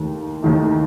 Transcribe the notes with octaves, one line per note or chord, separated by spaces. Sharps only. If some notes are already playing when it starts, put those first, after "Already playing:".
Already playing: D#2 D#3 A3
D#2 D#3 A3